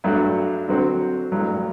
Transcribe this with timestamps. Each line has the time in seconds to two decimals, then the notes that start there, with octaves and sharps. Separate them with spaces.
0.04 G2 F#3 A3 D4 F#4
0.68 D3 F#3 C4 F#4
1.32 A1 G2 F#3